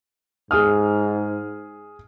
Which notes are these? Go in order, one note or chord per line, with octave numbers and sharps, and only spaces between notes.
G#2 G#4 D#6 F6